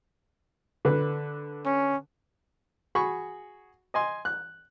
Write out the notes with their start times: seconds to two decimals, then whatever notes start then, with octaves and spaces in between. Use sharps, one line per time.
0.85 D3 B4
1.66 C#4
2.95 F#4 G#4 B5 C#6
3.94 D#5 G#5 C6
4.25 F#6